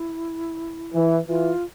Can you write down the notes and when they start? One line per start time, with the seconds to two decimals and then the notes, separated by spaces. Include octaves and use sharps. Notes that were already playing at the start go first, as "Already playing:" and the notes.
Already playing: E4
0.94 E3
1.28 E3 F4